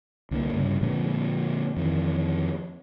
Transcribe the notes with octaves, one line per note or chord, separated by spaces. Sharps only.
C2 D3 G3 A#3
G2 C#3
A#2 D3 F3 G#3
F2 D#3 E3